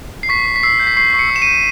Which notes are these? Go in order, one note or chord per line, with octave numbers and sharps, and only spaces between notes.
C7
C#6 B6
C#6
B6
E6 C7
G6
B6
C#6 C7
C#6
C#7
E6
E7
G6 D#7